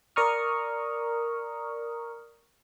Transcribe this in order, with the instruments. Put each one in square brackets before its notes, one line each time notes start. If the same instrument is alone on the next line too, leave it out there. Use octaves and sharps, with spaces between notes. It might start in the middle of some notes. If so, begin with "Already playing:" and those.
[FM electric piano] A#4 D5 A#5 C#6 D#6 F6